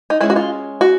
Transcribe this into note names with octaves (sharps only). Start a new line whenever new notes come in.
D#4
G#3 C#4 E4
F#4
F4
F#4